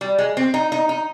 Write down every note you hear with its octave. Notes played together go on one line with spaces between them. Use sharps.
G3
G#3
C4
D#4
D#4
D#4